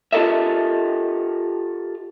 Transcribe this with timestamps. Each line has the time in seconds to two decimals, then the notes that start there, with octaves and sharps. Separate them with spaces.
0.12 F4 G4 A4 A#4 D#5 E5